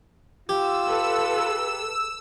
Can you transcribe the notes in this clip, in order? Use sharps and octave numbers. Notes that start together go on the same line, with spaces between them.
F4 G4 E6
A4 B4